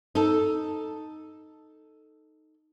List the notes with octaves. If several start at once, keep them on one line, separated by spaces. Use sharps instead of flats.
D#4 A4